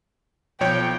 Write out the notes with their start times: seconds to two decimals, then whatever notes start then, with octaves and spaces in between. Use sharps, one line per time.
0.61 B1 F3 C#5 G5